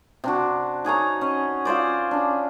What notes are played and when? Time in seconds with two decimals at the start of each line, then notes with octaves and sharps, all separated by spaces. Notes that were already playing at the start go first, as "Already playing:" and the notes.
0.24 C3 D4 F#4
0.85 D#4 G#4 C#5 A#5
1.21 C#4 D#5
1.65 F4 G#4 C5 D5
2.11 C#4 D4